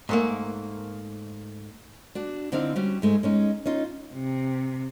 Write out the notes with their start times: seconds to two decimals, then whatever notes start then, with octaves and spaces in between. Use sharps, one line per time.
0.09 G#2 A3 A#3
2.15 D4 F#4
2.52 D3 C4 D#4 E4 F5
2.76 G3 C#4 F#4
3.02 G#2 G#3 A3
3.23 G#3 C#4 D#4
3.66 C#4 D#4 F4
4.13 C3